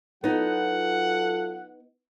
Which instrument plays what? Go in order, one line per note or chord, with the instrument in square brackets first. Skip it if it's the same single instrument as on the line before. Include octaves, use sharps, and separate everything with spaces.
[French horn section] F#3 F4 A4 [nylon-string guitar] B3 D#4 [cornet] F#5